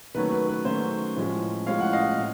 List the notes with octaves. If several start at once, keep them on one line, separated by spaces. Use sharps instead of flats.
D#3 F#3 A3 C#4 B4
B4
B4
D#3 F#3 A3 C#4 C5
A2 F3 G#3 C#4
A2 F3 G#3 C#4 F5
F#5
D#5 F5
A2